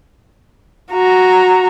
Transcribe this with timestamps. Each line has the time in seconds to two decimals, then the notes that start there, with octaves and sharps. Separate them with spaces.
0.92 F#4 A#5